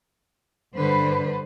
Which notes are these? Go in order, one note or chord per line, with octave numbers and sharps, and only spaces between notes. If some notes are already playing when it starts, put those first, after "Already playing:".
G2 D3 B4 C5